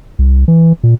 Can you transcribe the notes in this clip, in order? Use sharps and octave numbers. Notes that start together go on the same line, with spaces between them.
C2
E3
A#2